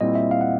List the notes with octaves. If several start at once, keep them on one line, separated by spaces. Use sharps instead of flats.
A#2 G3 C4 E4 D#5
E5
F5
F#5